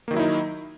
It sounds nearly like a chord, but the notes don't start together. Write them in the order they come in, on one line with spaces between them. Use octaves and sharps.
A#3 D#3 F#3 E4 D#4